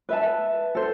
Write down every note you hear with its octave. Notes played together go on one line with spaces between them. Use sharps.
B4 E5 A5
A4 C5